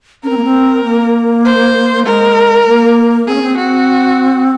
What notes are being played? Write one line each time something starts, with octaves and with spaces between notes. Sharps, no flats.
C#4 A#4
C4
A#3
C4
A#3
C5
G#3 A#4
A#3
C4 G#4
C#4
C4
C4 F#4